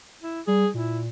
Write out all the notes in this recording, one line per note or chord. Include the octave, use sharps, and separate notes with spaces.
E4
G3 G#4
A#2 E4